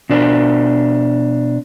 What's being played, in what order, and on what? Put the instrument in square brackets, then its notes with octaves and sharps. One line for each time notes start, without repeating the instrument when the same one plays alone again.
[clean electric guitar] B2 D4 C5